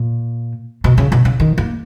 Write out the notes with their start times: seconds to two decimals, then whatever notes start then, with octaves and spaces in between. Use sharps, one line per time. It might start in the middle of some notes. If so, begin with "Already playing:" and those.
Already playing: A#2
0.84 B2
0.98 C#3
1.12 B2
1.25 C#3
1.40 D#3
1.58 A#3